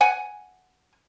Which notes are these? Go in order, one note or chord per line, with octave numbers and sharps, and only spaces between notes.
F#5 G#5